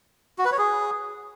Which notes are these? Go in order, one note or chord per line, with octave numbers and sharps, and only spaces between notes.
F#4
B4
C#5
G#4